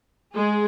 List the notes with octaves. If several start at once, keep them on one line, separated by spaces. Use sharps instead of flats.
G#3 G#4